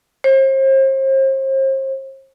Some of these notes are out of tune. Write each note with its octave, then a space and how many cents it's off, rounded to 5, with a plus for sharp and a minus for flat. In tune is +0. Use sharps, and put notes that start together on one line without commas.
C5 +40